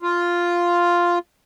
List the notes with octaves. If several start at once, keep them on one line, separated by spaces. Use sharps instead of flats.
F4